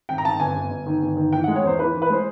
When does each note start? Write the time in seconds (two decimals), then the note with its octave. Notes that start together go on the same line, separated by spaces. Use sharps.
0.09 G#1 G5
0.18 A#5
0.25 G#1 A5
0.40 G1 G#5
0.56 G1
0.71 G1
0.86 D#3
1.02 G1
1.17 D#3
1.33 E3 G5
1.44 F#5
1.48 G#3
1.56 C#5
1.64 E2 C5
1.79 E3 B4
1.95 E3
2.02 B4
2.10 G#3 C5